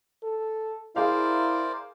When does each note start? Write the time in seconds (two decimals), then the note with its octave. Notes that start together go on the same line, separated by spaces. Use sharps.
0.24 A4
0.96 E4 G#4 A#4 C5 D5 F5